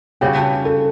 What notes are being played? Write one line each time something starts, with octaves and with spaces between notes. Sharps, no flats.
C#3 G3 C#4 F#4 G5
A5
A4